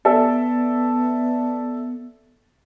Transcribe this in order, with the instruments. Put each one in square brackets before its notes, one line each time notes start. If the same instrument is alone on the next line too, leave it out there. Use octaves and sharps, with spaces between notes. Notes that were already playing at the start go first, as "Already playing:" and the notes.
[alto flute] B3 [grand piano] A4 D5 E5